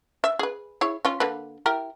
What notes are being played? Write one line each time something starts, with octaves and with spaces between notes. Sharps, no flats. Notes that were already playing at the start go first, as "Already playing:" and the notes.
E5
G#4 B4
E4 G#4 C#5
C#4 F4
D3 A#3 B4
E4 G4 A#4